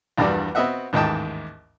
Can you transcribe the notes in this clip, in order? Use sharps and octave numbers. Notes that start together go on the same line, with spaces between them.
A#1 E2 G2 G3 F#4 D5
B3 C4 F#4 D#5 E5 F#5
A1 D#2 G#2 D#5 G5 A5